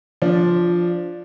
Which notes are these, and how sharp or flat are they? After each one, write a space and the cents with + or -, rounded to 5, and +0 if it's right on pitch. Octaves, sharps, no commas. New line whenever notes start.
F3 +0 D4 +0